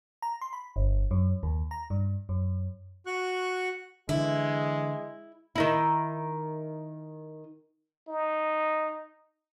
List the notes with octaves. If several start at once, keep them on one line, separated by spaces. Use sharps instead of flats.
A#5
C6
B5
G1
F#2
D#2
A#5
G2
F#2
F#4 C#6 F#6
D3 E3 G#3 E4
D#3 D#4 E4
D#4